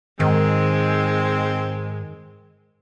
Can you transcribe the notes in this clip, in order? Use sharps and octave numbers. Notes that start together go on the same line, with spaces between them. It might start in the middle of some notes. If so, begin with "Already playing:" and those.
G#2 D#3 G#3 C4